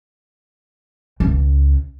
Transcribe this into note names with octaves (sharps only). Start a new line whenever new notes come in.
C#2